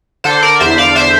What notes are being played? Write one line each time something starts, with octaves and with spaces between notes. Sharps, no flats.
D3 A4 C5
A#4 D5
E2 C5 E5
D5 F5
D3 C5 E5